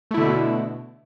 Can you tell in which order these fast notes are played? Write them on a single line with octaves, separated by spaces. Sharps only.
A3 E4 D3 B2